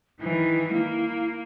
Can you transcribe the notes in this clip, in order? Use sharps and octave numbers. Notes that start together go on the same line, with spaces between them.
D#3 E3 E4
A#3